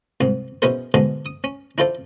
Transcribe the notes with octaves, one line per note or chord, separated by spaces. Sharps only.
C2 G#2
B2 C#4 E4 G#4 A#4 C5
G#2 B2 D3 G#3
D#6
C#4
D4 E4 F4 A4 C5 D5